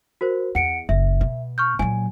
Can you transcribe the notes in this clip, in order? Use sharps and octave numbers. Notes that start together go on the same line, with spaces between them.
F#4 A#4 C5
E2 F#5 C#7 D7
F#1 E5
B2
C#6 F6 G6
A#2 F#3 G#5